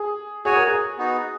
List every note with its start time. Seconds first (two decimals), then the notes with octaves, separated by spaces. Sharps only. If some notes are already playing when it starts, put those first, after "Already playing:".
Already playing: G#4
0.45 F#4 G#4 C#5 G#5
0.56 A#4
0.67 G#4
0.98 B3 D#4 F#4